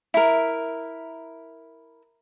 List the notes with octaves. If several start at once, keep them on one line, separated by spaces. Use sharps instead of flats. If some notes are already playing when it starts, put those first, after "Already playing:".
E4 A#4